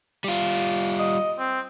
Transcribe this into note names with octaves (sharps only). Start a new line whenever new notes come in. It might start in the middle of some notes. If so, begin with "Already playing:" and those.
G3 F4
D#5
C4